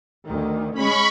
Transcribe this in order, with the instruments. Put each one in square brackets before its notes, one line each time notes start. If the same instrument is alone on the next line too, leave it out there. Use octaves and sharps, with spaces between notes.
[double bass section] D2 D#3
[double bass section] G#3 C#4 [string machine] B5 C#6